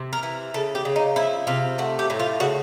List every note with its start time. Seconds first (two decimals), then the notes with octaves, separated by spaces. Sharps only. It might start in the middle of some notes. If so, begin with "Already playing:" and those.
Already playing: C3
0.13 A#4
0.23 E3
0.54 C#3 A4
0.75 G4
0.85 C#3
0.96 D#4
1.16 F3 E4
1.47 C3 F4
1.78 A3 F#4
1.99 G4
2.10 A2
2.20 F4
2.40 C#3 F#4